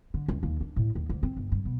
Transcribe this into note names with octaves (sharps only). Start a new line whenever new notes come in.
D3
C#2
D#2
D4
A2
D#2
D2
C4
G1
G2
B2